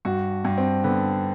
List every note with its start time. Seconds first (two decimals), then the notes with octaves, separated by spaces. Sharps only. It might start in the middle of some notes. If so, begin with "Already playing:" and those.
0.05 G2 F#4
0.45 G2
0.58 C4
0.84 D3 B3